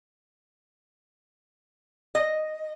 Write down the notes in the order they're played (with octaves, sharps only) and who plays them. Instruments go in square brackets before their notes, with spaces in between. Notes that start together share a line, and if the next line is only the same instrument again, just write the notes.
[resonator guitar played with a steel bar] D#5